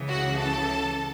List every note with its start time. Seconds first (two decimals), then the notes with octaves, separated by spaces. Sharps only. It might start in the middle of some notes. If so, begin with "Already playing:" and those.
Already playing: C#2 C#3 E3
0.08 F#4 F#5
0.38 A4 A5